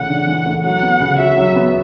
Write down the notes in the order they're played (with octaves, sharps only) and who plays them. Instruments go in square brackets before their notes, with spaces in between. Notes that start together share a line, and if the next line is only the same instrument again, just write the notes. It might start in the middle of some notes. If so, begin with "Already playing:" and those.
Already playing: [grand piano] C#3 E3 A3 [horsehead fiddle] F#5
[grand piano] D4
E3
A3
[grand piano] F#3 [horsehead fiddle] F#5
[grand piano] B3
C#3
[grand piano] F#4 [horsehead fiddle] E5
[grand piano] F#3
B3